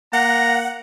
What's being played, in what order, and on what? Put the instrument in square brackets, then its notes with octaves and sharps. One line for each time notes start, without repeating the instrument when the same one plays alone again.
[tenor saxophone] A#3 [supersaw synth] F#5 [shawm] A#5